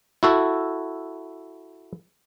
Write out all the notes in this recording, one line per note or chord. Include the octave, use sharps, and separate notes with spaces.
E4 F#4 A4